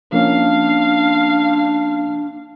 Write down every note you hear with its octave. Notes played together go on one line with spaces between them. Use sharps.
F3 A#3 C#4 D4 F5